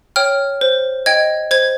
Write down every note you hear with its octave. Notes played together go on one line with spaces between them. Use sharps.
C#5 G5 F6
C5
D#5 G5 G#6
C5 G#6